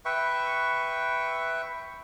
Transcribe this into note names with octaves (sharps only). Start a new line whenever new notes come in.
B4 E5 G5 C#6